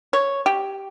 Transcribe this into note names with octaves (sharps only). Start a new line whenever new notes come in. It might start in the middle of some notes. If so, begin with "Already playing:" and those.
C#5
G4